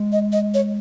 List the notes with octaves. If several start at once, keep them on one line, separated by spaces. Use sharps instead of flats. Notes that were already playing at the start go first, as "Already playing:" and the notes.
Already playing: G#3
D#5
D#5
C#5